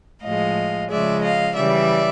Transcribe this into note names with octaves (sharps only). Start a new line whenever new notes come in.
A2 F3 G#3 D#5 F5
C#3 F3 G#3 D5 E5
D#5 F5
C#3 E3 G3 D5 E5